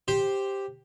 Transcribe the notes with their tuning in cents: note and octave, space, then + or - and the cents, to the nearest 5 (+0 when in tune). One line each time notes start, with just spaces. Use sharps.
G4 +0 C5 +0